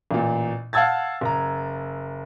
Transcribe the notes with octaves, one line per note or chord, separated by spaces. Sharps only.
A1 A#2
F5 F#5 A5 E6 G#6 A6
F#1 A#5